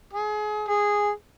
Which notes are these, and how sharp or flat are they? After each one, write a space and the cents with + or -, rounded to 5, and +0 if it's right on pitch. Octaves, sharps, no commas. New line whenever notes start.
G#4 +30
G#4 -10